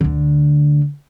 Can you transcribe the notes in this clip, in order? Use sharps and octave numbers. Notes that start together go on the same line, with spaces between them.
D2 D3